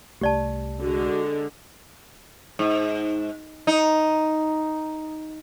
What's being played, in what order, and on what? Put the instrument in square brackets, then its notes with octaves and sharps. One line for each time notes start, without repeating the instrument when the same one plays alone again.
[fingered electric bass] C2 A3 [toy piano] G4 D5 A5
[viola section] D3 G#3 [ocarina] F#4
[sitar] G#2
D#4